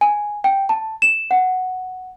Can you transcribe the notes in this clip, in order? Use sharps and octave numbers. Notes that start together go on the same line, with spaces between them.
G#5
G5
A5
E7
F#5